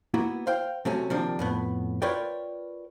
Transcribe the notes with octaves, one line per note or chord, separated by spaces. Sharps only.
A#3 B3 E4 F#4
C5 F5 G5
C3 F#3 A3 C#4
C3 D#3 F3 A#3 D4
F2 A2 B3
F4 A#4 B4 C#5 D5 G5